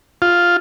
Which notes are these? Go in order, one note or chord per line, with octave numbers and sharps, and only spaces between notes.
F4